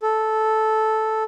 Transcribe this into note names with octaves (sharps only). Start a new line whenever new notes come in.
A4